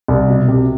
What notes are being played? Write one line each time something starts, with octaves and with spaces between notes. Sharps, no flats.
C2
B2
C3